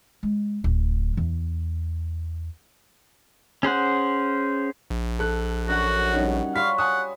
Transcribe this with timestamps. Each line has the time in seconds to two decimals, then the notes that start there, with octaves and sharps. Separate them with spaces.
0.23 G#3
0.64 D1
1.17 E2
3.63 C#4 G#4 C5 F#5
4.90 A#1
5.19 A4 F#6
5.68 F#2 D3 F#4 F#5
6.13 G3 C#4 D#4 F#5
6.56 G3 F4 C#5 F5 B6
6.78 F#5 G#5 D#6